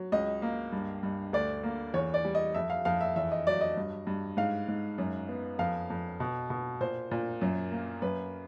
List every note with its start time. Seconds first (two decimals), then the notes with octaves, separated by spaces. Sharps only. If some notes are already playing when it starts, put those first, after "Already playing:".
Already playing: F#3
0.12 C#2 D#5
0.42 A#3
0.72 G2
1.03 G2
1.33 D2 D5
1.63 A#3
1.94 E2 C#5
2.14 D5
2.25 G3
2.35 D#5
2.54 F2 E5
2.70 F5
2.85 F2 F5
3.01 E5
3.16 E2 E5
3.32 D#5
3.47 F#3 D5
3.61 D#5
3.77 G2
4.07 G2
4.37 G#2 F5
4.68 G#2
4.98 F#2
5.29 B3
5.59 F2 F5
5.90 F2
6.20 B2
6.50 B2
6.81 A#2 C5
7.11 A#2
7.41 F#2
7.72 A#3
8.02 F#2 B4